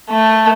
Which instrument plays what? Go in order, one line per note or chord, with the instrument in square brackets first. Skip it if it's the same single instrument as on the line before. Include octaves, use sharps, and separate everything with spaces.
[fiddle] A3